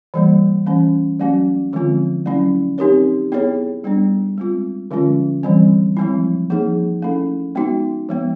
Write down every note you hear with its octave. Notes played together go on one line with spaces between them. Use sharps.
E3 G3 A#3
E3 A3 C#4
F#3 A3 C#4 F#4
D3 F3 G#3 C4 F4
F#3 A3 C#4 E4
C4 D#4 G4 A#4 C#5
B3 E4 G#4 C#5
G3 B3 D4
G#3 C4 F4
D3 F3 G#3 C#4 F4
E3 G3 C4
F3 G#3 C4 E4
F3 A#3 D#4 G#4
A3 C#4 E4 A4
G#3 B3 D#4 F#4
F3 G#3 B3